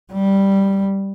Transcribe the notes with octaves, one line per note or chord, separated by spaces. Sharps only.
G3